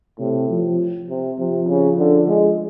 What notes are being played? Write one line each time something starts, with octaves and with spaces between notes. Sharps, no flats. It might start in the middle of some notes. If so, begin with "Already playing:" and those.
A2 C3
F3
C3
C3 F3
C#3
D3
G#3